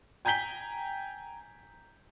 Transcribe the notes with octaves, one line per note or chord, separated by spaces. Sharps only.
G5 G#5 A#5 G6 B6 G7